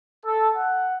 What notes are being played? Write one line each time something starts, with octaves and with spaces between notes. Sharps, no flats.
A4
F#5